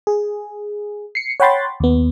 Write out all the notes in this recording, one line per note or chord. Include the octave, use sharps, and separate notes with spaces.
G#4
C7 C#7
C#5 F#5 G5 B5 C6 A6
D#2 B3